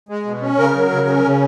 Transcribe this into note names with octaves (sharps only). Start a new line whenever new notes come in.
G#3
B2
C#4
C#3 A#4
F#3
C#3
C#4
C#3